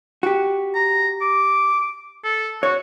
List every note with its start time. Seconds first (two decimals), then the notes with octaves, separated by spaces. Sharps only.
0.23 F#4 G4
0.75 A#5
1.21 D6
2.24 A4
2.63 F#4 C#5